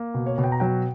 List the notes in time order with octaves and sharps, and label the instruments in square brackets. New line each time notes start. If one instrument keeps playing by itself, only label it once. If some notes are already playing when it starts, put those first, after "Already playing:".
Already playing: [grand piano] A#3
B2
C#5
B2
G5
A#5
F#3 G5